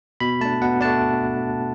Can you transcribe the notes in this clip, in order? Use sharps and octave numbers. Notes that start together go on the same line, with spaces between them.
B2 B5
A3 D4 A5
B2 F#5
A3 D4 A5